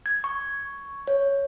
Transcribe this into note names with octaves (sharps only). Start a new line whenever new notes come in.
G#6
C#6
C#5